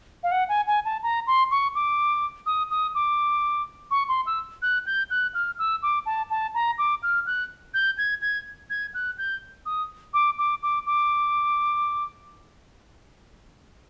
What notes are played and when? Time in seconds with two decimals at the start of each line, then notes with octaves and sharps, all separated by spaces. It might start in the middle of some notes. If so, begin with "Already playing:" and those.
0.23 F5
0.32 F#5
0.49 G#5
0.67 G#5
0.85 A5
1.03 A#5
1.27 C6
1.51 C#6
1.75 D6
2.46 D#6
2.71 D#6
2.95 D6
3.91 C#6
4.09 C6
4.27 E6
4.62 F#6
4.86 G6
5.10 F#6
5.34 F6
5.59 E6
5.82 D6
6.06 A5
6.30 A5
6.55 A#5
6.78 D6
7.03 F6
7.27 F#6
7.74 G6
7.98 G#6
8.22 G#6
8.70 G#6
8.94 F#6
9.18 G6
9.66 D#6
10.14 D6
10.38 D6
10.63 D6
10.86 D6